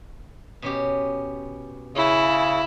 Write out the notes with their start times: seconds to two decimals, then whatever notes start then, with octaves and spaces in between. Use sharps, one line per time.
0.62 B2 C#4 G4
1.96 C#3 E4